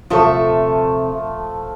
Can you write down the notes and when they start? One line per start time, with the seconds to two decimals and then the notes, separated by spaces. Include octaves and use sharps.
0.10 D#1 C3 F3 A3 A4 E5